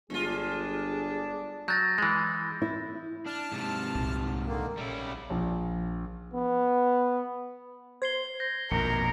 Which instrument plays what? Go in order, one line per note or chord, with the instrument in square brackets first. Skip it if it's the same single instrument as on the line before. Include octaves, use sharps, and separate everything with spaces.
[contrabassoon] G1 [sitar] G#3 F4 [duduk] G#4
[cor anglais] D4
[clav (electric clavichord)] F#3 [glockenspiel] G6 A6 A#6
[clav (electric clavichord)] E3 G#3
[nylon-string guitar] E4
[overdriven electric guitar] D4 [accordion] A5 F6
[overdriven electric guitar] G#2 C3
[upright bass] C2 A#2
[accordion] D3 D#3 A#3
[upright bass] A#1 [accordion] C#3 [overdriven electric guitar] G3 E4
[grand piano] A#1
[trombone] B3
[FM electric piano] C5 [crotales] G#6 C7 G7
[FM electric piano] G6 [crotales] A#6
[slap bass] A#1 F2 B2 [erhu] A#4 [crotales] C#7